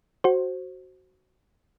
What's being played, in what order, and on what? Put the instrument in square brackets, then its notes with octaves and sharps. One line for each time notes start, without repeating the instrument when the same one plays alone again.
[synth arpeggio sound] F#4 C5